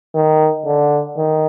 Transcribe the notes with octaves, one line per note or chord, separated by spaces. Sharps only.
D#3
D3
D#3